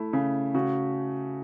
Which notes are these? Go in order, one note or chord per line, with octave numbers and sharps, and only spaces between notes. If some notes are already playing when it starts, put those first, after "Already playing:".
Already playing: A3 E4
C#3
C#3 F#4